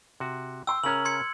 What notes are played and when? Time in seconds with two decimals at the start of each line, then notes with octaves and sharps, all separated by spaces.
0.20 C3 F#4
0.67 G5 C6 E6
0.84 C#3 C#4 A#4 A#5 F6 F#7
1.05 C6 G#6 C#7